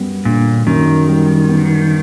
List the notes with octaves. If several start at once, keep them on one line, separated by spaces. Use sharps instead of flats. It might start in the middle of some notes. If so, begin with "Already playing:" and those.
Already playing: F#2 G3 B3
A#2 D3
F#2 D#3
G3
B3